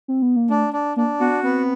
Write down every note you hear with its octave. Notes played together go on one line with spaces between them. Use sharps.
C4
B3
A#3
A3 D4
D4
A#3 D4
B3 F#4
B3 C4